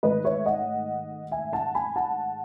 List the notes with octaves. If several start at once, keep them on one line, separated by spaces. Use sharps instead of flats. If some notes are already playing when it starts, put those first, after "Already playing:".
G#2 D#3 A3 B4 D#5
C#5 E5
D#5 F#5
E5 G#5
F#5 A5
G#5 B5
F#5 A5